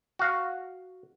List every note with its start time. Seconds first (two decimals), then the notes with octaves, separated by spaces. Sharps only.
0.19 F#4 F5